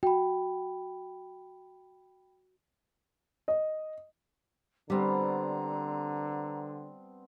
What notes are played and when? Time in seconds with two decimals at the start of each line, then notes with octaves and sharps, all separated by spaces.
0.03 F#4 G5 B5
3.48 D#5
4.90 D3 G3 B3 C4 D4 A#5